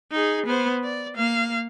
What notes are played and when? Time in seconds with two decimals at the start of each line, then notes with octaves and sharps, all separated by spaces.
0.12 D#4 G#4
0.46 B3 C5
0.83 D5
1.15 A#3 F5